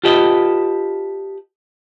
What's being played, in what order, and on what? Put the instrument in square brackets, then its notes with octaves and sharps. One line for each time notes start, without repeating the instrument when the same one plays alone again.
[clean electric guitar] F4 G4 A4 B4 D#5